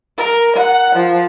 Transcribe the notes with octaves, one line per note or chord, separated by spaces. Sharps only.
A#4
F#5
F3